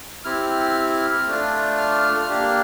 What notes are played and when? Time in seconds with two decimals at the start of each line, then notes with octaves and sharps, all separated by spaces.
0.24 C4 E4 G4 F6
1.27 A3 D4 F4
1.78 F6
2.29 A#3 D4 G4